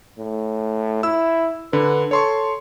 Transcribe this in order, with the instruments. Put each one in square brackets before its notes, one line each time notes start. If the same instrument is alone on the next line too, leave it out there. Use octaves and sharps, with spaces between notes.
[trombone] A2
[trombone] E4 [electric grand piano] E6
[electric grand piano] D3 [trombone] B4
[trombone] A4 [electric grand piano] C#5 C6 C#6